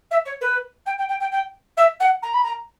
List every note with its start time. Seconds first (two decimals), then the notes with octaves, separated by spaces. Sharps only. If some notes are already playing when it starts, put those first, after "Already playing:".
0.11 E5
0.25 C#5
0.41 B4
0.86 G5
0.98 G5
1.09 G5
1.20 G5
1.32 G5
1.77 E5
2.00 F#5
2.22 A#5
2.33 B5
2.43 A#5